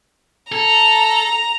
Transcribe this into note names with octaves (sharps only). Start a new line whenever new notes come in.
A4 A#5